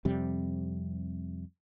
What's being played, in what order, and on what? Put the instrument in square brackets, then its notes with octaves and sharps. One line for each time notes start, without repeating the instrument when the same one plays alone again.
[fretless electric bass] F2 C3 G3